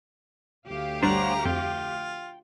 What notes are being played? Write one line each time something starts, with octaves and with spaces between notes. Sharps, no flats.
D2 G4 F5
G1 G3 D4 C5 C#5 F#5 A#5
F2 F4 G5